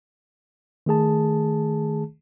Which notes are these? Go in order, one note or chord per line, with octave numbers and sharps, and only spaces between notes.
D#3 A3 G#4 A5